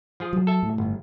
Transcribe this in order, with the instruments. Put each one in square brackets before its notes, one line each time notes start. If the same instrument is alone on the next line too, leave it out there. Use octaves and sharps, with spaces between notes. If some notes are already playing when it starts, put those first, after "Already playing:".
[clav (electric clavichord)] F3 F4 G#4
[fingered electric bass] F#3
[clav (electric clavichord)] A4 E5
[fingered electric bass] A2
[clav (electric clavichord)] G1